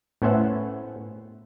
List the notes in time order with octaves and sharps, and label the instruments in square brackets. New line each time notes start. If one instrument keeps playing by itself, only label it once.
[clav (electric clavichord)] A2 B3 C#4 C5 E5 F#5